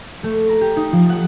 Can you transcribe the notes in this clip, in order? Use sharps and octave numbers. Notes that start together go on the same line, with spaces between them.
A3
A#5
G4
D#4
F3
F#5